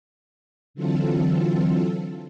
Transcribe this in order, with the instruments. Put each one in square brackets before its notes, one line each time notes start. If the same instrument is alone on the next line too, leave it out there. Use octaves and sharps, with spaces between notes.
[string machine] D3 E3 F#3 C4 F4 A4